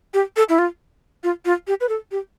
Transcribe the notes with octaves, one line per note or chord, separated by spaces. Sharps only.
G4
A4
E4
F4
F4
F4
G4
B4
A4
G4